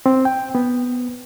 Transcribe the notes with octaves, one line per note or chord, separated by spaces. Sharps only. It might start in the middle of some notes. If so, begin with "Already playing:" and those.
C4
G5
B3